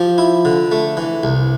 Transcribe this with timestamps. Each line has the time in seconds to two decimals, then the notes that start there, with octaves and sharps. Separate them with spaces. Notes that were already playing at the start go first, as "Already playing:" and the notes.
Already playing: F3 G4
0.18 E4
0.45 D3
0.71 A3
0.97 E3
1.23 C2